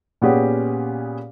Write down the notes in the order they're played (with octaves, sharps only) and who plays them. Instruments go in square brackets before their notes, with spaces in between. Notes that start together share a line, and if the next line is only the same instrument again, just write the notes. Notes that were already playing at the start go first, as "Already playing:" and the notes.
[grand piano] A#2 B3 C#4 G4 G#4